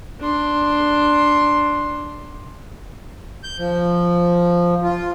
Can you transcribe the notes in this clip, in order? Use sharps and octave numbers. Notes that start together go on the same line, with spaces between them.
D4 C6
G6
F3
F4